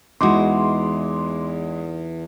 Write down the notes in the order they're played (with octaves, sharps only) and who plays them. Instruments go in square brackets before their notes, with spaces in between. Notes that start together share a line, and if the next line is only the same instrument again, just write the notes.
[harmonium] E2 [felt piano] E3 G#3 E4 [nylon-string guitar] D#4 F#4 [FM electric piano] C6 D6